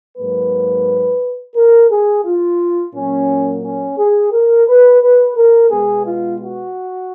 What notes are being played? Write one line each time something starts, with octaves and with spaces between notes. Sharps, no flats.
G#2 F#3 A#3 B4
A#4
G#4
F4
A#2 F#3 A#3 C#4
C#4
G#4
A#4
B4
B4
A#4
B2 G#3 B3 G#4
F4
F#4